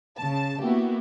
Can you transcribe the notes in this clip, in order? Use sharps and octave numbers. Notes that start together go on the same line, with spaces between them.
C#3 A5
A#3 B3 E4 F#4 G4